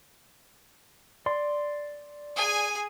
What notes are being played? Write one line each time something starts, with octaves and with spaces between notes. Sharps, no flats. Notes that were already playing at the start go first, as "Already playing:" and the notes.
D5 C6
G#4 G#5